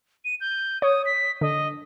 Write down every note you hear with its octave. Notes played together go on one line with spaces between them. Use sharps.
D#7
G6
C#5 D#6
B6
D3 D#5